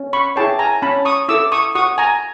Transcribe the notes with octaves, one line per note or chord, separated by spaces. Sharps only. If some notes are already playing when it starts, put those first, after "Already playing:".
Already playing: C#4
B5 C#6
E4 G#4 C#5 G5 A5
G#5 A#5
C#4 A5 B5
C#6 D#6
E4 A4 D6 E6
C#6 D#6
F#4 C#6 D#6
G#5 A#5